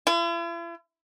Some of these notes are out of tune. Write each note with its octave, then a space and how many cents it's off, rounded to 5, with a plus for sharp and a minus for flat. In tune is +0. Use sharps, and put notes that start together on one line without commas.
E4 +45